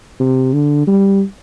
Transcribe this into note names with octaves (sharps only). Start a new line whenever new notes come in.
C3
D3
G3